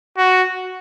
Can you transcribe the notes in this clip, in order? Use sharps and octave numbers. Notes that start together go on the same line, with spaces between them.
F#4